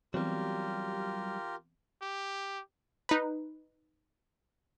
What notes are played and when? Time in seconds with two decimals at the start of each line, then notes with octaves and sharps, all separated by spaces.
0.14 E3 F#3 G3 B3 C4 F4 G4 A#4
2.02 G4
3.09 D#4 B4